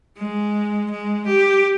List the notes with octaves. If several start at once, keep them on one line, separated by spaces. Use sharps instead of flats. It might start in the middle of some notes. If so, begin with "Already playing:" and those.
G#3
G#3
G4